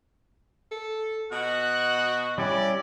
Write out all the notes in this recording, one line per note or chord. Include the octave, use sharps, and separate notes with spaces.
A4
B2 F#4 D#5 F#6
G3 C#4 E4 D5